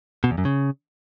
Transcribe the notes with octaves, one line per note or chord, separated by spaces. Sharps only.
B2
E2
F#2
C#3